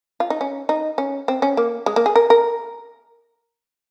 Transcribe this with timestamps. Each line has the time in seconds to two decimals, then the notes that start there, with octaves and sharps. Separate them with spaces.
0.20 F4
0.30 D#4
0.41 C#4
0.69 D#4
0.98 C#4
1.28 C4
1.42 C#4
1.57 A#3
1.86 G#3
1.96 A#3
2.06 G#4
2.16 A#4
2.30 A#4